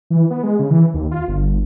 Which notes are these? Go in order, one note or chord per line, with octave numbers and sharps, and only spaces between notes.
E3
B3
G#3
C#3
E3
D#2
F4
G1